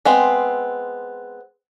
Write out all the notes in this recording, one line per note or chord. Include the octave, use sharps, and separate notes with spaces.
G#3 B3 C4